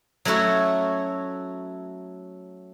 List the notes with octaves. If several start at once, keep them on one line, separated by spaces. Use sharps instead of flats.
F#3 A3 C#4 E4 F#4